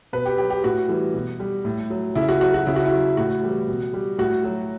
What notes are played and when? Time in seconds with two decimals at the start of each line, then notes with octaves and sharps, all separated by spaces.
0.13 B2 B4
0.25 G4
0.38 F#3 G4
0.50 G4
0.63 A2 F#4
0.89 E3 G3
1.14 B2
1.40 G3
1.65 A2
1.90 F#3
2.15 C#3 E4
2.29 F#4
2.41 F#3 F#4
2.54 F#4
2.67 C#3 E4
2.76 F#4
2.86 E4
2.92 F#3
3.17 A2 F#4
3.43 E3 G3
3.68 B2
3.93 G3
4.18 A2 F#4
4.44 F#3